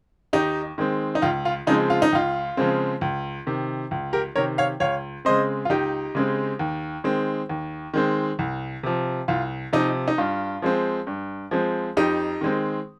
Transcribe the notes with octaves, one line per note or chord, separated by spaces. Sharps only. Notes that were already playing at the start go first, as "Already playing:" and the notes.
D#2 D#4 G4
D#3 G#3 C4
D#4
C#2 F4
F4
C#3 F3 G#3 C4 D#4
F4
D#4
C#2 F4
C#3 F3 G#3 C4
C#2
C3 D#3
C#2
G4 A#4
C3 D#3 A#4 C#5
C#5 F5
C#2 C#5 F5
C#3 G#3 C4 C5 D#5
F4
C#2 D#4 G4
C#3 G#3 C4
D#2
D#3 G#3 C4
D#2
D#3 G#3 C4
C2
C3 F3
C2 F4
C3 F3 D#4
D#4
G2 F4
F3 G#3 C4
G2
F3 G#3 C4
F2 D#4 G4
D#3 G#3 C4